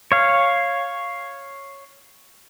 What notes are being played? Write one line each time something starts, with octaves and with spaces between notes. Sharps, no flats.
C#5 F5